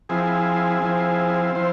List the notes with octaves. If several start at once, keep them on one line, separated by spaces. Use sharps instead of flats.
F3 C4 E4 G#4
F3 C4 E4
F3 C4 E4 C5